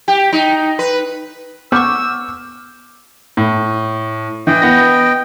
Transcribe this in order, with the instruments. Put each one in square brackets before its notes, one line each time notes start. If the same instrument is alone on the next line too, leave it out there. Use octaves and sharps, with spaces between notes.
[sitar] G4
D#4
B4
[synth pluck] B3 C#6 [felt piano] D6 F6 G6 [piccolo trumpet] E6
[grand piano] A2
[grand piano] E3 [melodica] D#5 G5
[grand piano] B3 A#6